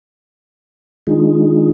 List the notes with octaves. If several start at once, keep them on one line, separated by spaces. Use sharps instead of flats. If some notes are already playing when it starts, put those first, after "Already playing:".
D#3 G#3 D4 D#4 F4 G#4